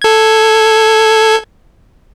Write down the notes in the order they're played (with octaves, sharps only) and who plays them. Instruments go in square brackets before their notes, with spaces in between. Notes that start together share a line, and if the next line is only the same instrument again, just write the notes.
[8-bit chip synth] A4 G#6